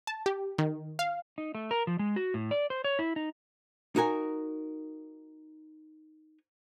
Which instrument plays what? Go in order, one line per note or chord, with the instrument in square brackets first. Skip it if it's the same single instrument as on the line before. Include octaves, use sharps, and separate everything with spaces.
[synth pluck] A5
G4
D#3
F5
[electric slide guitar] D#4
A3
A#4
F3
G#3
F#4
A2
D5
C5
C#5
E4
D#4
[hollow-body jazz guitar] D#4 F#4 A#4 G#5